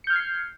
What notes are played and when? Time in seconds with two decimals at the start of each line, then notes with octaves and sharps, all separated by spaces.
0.04 C#7
0.07 G6
0.10 F6
0.13 G#6
0.16 C7